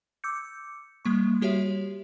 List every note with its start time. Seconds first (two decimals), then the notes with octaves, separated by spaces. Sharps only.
0.24 D6 E6 G6 C#7
1.05 G3 A#3 C#6
1.42 G3 F#4 G4 C#5 E5